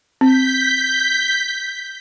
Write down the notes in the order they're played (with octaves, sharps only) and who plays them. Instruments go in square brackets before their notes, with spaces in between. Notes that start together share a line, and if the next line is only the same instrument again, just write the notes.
[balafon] C4 [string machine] G6 B6